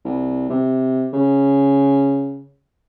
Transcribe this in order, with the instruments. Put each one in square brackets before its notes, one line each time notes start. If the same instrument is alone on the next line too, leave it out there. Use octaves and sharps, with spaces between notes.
[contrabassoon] C2
C3
C#3